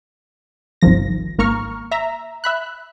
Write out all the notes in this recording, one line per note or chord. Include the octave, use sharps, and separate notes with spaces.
G1 C2 D#3 F3 A#6
G#1 A#3 A#5 C#6 F6
E5 A#5
E5 B5 F#6